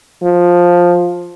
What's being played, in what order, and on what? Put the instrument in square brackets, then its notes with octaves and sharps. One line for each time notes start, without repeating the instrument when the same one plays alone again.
[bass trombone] F3